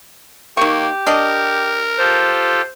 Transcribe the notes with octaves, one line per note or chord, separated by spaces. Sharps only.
D#3 A#3 G4 C#6
D4 A#4 D5 D#5
F4 G4 A4 C5